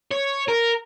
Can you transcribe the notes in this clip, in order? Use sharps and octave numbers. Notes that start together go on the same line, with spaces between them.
C#5
A#4